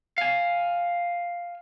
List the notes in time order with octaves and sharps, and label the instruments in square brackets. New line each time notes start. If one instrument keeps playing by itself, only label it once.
[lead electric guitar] F5 G#5